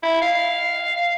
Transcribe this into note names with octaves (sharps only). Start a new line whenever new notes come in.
E4
F5